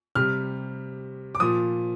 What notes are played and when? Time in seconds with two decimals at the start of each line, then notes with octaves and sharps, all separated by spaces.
0.15 C3 G3 F6
1.35 D6
1.40 A#2 F3 D#6